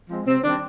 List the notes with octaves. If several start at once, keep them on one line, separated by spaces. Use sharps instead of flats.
F3 G#3 C4
C3 C4
D#3 G3 C4 D4